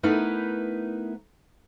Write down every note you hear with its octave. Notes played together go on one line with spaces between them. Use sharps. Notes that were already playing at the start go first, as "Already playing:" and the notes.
A3 B3 D#4 E4 A#4 B4